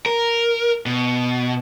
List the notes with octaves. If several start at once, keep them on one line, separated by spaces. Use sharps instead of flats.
A#4
B2